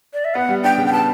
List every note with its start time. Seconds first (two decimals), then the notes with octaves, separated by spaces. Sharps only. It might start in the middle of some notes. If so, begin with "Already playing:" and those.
0.14 D5
0.25 E5
0.34 B3 F#5
0.49 G3
0.64 D4 G5
0.78 C#3
0.87 G5
0.92 B3 A5